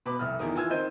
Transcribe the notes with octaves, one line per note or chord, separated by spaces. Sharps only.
B2 B4 B5 D6
F1 C2 D#6 F6
E2 D#3 A#4 D#6
E3 F4 G#5 E6 G#6
D#3 C4 D#4 C5 G6 D#7